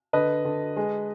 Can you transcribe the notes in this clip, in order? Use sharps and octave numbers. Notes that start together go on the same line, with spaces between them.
D3 B4 D#5
D3
G#3